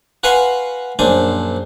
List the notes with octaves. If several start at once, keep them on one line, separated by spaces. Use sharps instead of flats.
F#4 B4 F5 F#5 G#5 C6
A#1 F#2 D4 C5 G#5